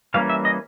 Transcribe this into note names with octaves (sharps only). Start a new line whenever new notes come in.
E3 G3 A#3 C#4 F5
E5
D#5